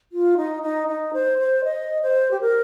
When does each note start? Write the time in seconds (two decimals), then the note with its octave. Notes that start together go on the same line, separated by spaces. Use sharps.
0.12 F4
0.37 D#4
0.62 D#4
0.88 D#4
1.13 C5
1.39 C5
1.64 D#5
2.03 C5
2.31 G4
2.41 A#4